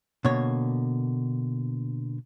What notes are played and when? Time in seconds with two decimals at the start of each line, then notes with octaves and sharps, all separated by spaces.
0.25 B2 D3 A#3 C#5